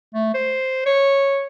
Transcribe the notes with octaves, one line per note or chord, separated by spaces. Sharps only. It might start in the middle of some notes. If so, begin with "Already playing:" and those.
A3
C5
C#5